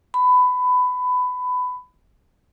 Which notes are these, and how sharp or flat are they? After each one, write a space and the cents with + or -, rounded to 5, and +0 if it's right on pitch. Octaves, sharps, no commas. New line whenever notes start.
B5 +20